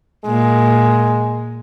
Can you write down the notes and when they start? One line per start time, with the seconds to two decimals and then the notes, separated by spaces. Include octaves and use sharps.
0.26 A#2 G#3